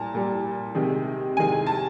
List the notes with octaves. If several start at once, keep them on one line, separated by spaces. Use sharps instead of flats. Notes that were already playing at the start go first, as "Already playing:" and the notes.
Already playing: A#2 G3 A5 A#5
A#2 G3
C3 D#3 G#3
C3 D#3 G#3 G#5
G#5
A5